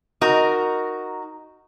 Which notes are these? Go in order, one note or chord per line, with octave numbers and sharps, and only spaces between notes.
D#4 F#4 A#4